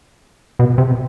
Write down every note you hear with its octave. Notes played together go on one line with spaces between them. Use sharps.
B2
C3